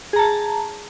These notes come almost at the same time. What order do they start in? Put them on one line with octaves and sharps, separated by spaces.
G#4 A#5 A5